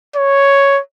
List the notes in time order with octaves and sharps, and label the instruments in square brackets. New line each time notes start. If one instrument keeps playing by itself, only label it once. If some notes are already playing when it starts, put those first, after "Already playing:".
[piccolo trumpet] C#5